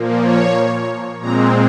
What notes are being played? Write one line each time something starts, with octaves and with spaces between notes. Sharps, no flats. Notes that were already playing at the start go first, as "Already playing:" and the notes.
Already playing: A#2 F3 A#3
C#5
A#2 G#3 C4 A#5